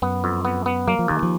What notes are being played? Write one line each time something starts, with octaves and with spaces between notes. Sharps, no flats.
F#2 B3
F2
B3
B3
F#3 A#3
F3
D#2 D#3
F3